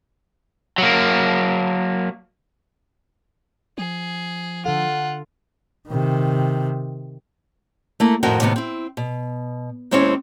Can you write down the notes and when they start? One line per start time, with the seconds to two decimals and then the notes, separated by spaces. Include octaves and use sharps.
0.78 F#3 A#3
3.78 F3 G#4
4.66 D3 F4 A4 F#5
5.88 C3 D#3
8.00 A3 A#3 E4
8.23 F2 A2 D#3 F#4 A#4 G5
8.41 A2 C3 D#3 B3
8.56 C4 E4
8.97 B2
9.91 D#2 G#3 C4 C#4 E4 C#5